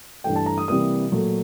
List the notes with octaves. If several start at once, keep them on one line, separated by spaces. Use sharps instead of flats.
G2 E3 A3 G5
A5
A#5
D#6
C3 E3 G3 A#3 D#6
A#2 F#3 A3